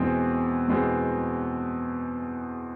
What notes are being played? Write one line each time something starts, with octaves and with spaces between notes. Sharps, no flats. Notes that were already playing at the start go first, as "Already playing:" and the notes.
Already playing: E2 B2 G#3 C4
E2 B2 G#3 C4